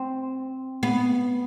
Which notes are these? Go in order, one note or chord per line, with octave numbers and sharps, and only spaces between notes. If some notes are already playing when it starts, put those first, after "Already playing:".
Already playing: C4
B3